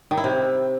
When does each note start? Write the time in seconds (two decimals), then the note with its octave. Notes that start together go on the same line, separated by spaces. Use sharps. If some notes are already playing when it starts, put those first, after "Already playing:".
0.11 D#3
0.17 E4
0.24 C3